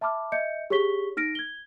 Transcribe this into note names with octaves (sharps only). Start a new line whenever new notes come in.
E5 A5 B5 D6 F6
D#5 E5 G6 C#7
G4 G#4 C#5 C#6 B6 G7
D#4 F6 A#6 D7
G#6 G7